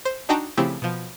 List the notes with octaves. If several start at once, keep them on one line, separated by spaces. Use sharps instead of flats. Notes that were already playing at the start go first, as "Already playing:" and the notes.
C5
D4 D#4 F#4 G5 A5 A#5
C#3 F3 A3 C4 E4 G4
B2 F3